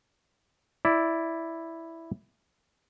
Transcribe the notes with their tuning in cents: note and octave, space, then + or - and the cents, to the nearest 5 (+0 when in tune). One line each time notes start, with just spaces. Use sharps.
E4 +0 D5 +0